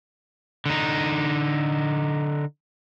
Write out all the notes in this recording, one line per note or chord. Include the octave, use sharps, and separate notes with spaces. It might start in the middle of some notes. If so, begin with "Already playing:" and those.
D3 D#4